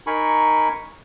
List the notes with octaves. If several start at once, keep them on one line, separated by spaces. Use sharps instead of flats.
D#4 A#4 G#5 B5 C#6